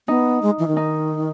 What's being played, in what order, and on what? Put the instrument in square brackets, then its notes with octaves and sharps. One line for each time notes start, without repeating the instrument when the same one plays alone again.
[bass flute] B3 [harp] D#4
[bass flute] G#3
E3
D#3
[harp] D#4